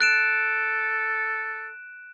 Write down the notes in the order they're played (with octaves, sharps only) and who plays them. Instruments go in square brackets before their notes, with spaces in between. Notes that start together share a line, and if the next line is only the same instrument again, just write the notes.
[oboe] A4 [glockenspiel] F#6 D7 E7